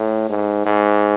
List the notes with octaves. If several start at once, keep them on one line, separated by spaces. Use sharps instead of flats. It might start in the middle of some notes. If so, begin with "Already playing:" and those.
Already playing: A2
G#2
G#2